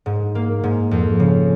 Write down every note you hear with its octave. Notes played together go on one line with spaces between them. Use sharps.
G#2
A#3
G#2
F2
C#3